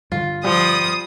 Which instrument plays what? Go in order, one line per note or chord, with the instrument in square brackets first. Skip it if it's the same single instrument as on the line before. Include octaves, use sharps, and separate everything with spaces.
[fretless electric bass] G2 D3 [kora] F4
[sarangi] F3 [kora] G3 [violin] D#6